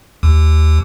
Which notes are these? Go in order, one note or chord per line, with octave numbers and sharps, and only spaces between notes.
D#2